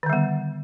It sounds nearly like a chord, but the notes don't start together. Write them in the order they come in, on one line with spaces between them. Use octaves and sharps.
D#3 D3 G3 B3